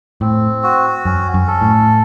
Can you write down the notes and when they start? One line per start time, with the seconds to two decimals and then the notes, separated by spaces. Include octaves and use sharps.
0.21 A2 C4
0.63 F#4
1.05 F#2 C#4
1.34 F#2
1.48 A4
1.62 A2